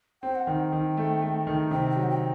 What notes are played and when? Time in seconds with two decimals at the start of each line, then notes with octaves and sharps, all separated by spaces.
0.23 C4 G5
0.35 F#5
0.47 D#3 G5
0.72 D#3
0.97 A3
1.22 A3
1.47 D#3
1.71 C3 G5
1.90 G5
1.96 F#3
2.03 F#5
2.09 G5